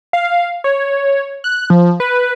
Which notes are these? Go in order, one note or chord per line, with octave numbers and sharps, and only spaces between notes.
F5
C#5
F#6
F3
B4